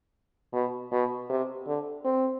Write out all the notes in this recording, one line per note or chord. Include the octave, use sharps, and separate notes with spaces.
B2
B2
C3
D3
C4